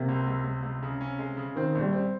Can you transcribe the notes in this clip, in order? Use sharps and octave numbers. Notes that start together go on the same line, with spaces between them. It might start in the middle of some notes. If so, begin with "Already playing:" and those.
Already playing: C3 A#3
C#2
C#2
C#2
C#2
C#3
C#4
G#3
C#3
D#3 C4
A#1
G3
C4